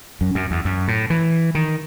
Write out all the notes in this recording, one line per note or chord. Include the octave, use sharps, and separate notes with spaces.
F#2
F#2
E2
F#2
A2
E3
D#3